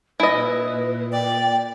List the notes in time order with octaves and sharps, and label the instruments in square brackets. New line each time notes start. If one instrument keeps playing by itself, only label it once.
[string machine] A#2 [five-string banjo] E4 D#5 [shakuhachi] B4
[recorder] D5 [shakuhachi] G5